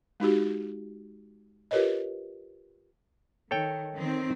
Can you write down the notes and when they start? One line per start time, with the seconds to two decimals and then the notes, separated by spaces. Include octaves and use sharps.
0.20 G#3 D#4 F#4 G4
1.71 F4 G4 A#4 B4 C#5 D#5
3.51 D#3 A4 C#5 G5
3.95 D#3 C4